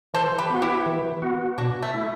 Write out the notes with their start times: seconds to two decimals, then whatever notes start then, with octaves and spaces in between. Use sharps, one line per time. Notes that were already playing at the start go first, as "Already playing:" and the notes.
0.14 E3 A4 C5
0.38 G4 B4
0.50 B3 F#4
0.62 E4 G4
0.86 E3
1.22 B3 F#4
1.58 B2 D4 F#4
1.82 A3
1.94 A3 E4